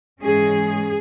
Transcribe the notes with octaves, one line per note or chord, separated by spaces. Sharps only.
G#2 E3 G#3 C#4 G#4